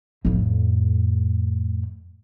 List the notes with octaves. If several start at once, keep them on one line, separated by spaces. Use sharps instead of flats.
F2 A2